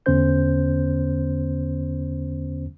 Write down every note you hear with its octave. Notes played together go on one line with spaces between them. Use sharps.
E2 D3 B3 C#4 C5 G6